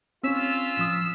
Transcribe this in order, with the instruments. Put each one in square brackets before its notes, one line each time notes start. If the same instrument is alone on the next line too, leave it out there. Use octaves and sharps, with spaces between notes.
[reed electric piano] C4 [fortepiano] C#4 [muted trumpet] F4 [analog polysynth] E6 B6 E7
[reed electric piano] A2 F3 D#6